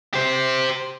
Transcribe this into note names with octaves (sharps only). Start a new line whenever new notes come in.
G4 C5